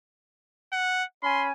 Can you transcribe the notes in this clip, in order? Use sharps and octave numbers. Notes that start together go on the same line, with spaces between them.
F#5
C#4 G#5 B5 C6